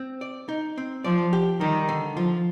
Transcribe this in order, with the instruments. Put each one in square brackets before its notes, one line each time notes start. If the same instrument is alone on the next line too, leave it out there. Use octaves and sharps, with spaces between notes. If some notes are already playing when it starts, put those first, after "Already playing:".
Already playing: [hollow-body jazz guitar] C4
D5
D#4
C4
[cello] F3 [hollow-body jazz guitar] D5
[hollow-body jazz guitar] G4
[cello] D#3 [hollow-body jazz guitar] G3
[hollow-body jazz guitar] D3
[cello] F3 [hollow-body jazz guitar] F4